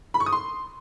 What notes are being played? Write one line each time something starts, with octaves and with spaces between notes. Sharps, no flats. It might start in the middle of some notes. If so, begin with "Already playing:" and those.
B5
C#6
D#6
C6